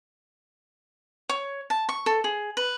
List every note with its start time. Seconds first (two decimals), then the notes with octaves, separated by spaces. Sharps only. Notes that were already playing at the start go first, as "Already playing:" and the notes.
1.29 C#5
1.70 A5
1.89 C#6
2.06 A4
2.24 G#4
2.57 B4